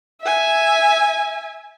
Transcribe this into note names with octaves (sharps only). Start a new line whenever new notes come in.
E5 G#5